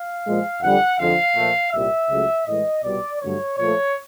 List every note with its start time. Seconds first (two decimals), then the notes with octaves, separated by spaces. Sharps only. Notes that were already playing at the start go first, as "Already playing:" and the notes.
Already playing: F5
0.25 A#2 F3 G#3
0.62 F2 D3 G3 F#5
0.99 F2 D3 F3 G#3 F5
1.36 A#2 F3 A3
1.72 C2 A#2 G3 E5
2.10 C#2 C#3 F#3 A3
2.47 A2 E3 G#3 D#5
2.84 C2 B2 G3 D5
3.21 G2 D3 F#3 A3 C#5
3.57 A#2 F3 A3 C#5